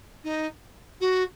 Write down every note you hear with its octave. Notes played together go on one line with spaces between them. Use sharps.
D#4
F#4